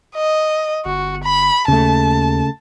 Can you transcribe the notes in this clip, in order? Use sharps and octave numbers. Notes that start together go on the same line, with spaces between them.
D#5
G1 F#4
B5
D#2 C#3 A3 A5